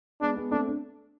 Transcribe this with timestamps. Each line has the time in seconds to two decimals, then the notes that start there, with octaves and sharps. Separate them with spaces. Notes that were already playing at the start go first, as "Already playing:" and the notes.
0.21 G#3 B3 D4
0.36 G#3 B3
0.51 A3 C4 D4
0.67 D4